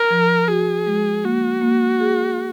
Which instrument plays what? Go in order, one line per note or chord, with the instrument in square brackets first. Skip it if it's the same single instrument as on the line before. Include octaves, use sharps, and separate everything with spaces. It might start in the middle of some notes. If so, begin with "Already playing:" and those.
Already playing: [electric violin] A#4
[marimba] F3
[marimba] F#4 [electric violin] G#4
[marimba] G#3
[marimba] A#3 [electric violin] F#4
[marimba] A#3
G#4